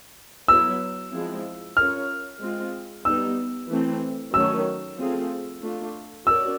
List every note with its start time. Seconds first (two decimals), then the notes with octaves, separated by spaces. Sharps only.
0.48 F#3 B3 E4 E6
1.12 F3 G#3 C4 E4
1.77 C#4 F4 A#4 C#5 F6
2.41 G#3 C4 F4
3.05 G3 B3 D#4 E6
3.70 E3 A3 C4
4.34 D#3 F#3 A3 C#4 E6
4.98 F3 A3 C4 F4 G#4
5.62 A3 D4 F4
6.27 C#4 F#4 A#4 D5 E6